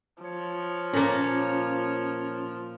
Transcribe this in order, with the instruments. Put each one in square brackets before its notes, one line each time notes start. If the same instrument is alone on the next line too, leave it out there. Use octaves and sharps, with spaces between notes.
[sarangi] F3 [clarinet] C#5
[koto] A#2 A#3 [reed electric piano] C#4